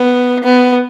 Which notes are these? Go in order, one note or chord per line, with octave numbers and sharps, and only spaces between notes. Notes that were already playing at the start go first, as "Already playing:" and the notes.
Already playing: B3
B3